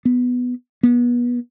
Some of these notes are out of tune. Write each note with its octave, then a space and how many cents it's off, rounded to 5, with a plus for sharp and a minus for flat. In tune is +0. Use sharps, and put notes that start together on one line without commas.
B3 +0
B3 -30